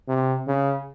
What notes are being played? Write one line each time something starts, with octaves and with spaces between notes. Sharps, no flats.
C3
C#3